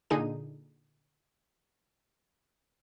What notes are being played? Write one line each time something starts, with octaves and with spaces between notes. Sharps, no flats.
A#2 D3 D#4 G#4 D#7